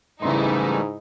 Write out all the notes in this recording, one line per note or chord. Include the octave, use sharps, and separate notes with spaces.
G#2 C#3 E3 G3 A3 D#4 E4 C6